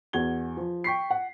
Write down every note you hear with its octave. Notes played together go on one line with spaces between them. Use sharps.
E2 F#4 G#6 G7
F3
G5 C#6 B6 C7
F#5